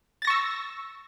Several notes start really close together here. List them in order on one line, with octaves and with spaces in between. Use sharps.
A6 A#6 C#6 E6